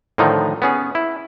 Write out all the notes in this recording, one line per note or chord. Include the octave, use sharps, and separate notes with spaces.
A2 D3 D#3 F3 D#4
B3 C#4 G#4
E4